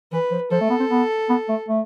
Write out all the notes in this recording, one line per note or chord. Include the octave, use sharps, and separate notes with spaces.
E3 B4
F3
F3 A4
A3
B3
C4
B3
B3
A3
A3